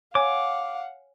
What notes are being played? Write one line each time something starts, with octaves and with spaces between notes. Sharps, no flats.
C#5 F5 F#5 G#5 D6